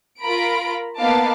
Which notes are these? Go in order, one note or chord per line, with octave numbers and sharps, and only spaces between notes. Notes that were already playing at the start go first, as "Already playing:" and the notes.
F4 A#4 A#5 B5 D7
A#3 B3 D#4 F5 A5 D6